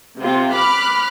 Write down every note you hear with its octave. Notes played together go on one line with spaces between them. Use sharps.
C3 F4
B5 D6 F6 F#6